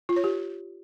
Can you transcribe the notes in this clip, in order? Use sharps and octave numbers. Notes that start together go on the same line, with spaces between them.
F4
C#5
G4